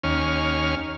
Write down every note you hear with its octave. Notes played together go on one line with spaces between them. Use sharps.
D#2 C#4 F6